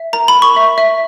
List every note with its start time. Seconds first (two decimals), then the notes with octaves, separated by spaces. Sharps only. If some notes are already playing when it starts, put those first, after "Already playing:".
Already playing: E5
0.13 A#4 A#5
0.28 B5
0.35 A#4
0.42 C#6
0.56 E5
0.78 E5